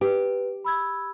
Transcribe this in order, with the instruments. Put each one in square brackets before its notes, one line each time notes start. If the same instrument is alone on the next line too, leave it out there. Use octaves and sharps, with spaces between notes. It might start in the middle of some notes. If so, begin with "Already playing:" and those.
[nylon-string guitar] G4 [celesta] B4
[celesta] B5 E6 G#6